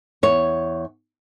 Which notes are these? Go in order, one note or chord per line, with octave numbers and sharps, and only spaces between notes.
E2 C#5